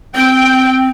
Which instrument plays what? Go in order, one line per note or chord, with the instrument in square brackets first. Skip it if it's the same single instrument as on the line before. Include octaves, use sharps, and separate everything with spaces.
[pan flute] C4 [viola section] G5